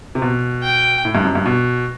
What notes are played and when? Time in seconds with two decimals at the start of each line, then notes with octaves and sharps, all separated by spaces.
0.15 C3
0.22 B2
0.63 G5
1.05 A2
1.15 G2
1.24 F#2
1.35 G2
1.45 B2